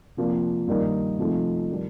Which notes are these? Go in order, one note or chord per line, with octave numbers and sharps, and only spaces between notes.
C3 F3 A#3 D4
G2 D#3 G3 A#3 D#4
C3 F3 A3 D#4
D#3 G3 D4